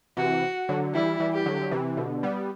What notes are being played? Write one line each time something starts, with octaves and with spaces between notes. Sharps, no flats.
C3 E3 F#4
D3 F#3
E3 G3 E4
E3 G3
G4
D3 F#3
F#3
C3 E3
B2 D3
G3 B3